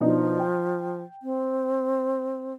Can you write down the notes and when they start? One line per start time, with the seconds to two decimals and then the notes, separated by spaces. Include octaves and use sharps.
0.01 B2 F3 D4 D#4
0.39 G5
1.22 C4